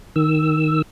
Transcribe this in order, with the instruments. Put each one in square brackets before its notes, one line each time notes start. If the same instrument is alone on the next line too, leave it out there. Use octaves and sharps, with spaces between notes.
[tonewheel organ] D#3 E6